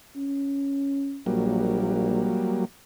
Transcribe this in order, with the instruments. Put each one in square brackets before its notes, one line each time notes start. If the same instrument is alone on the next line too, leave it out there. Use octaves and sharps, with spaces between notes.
[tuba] C#4
[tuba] A#1 [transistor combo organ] F#3 G3 A#3